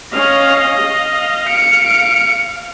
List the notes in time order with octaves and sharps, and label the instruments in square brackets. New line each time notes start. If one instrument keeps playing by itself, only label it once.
[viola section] C#4 F5 [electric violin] D#5
[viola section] F5
[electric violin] C#7 D7